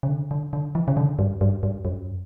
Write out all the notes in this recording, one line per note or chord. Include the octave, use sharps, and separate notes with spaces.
C#3
D3
D3
D3
E3
C#3
D3
G2
G2
G2
F#2